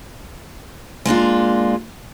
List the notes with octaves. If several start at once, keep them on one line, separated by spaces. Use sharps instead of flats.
G#3 A#3 D4 F4